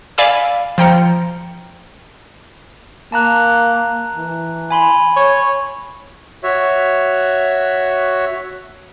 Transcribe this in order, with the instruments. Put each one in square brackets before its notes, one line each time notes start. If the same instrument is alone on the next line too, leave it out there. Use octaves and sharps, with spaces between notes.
[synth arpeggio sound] D5 F5 G#5 B5 D6 E6
F3 G5 A#5 C#7
[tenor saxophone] A#3 [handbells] A5 A#5 F#6
[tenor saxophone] E3
[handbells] G#5 B5 C6
[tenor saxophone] C#5
[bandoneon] F#4 C#5 E5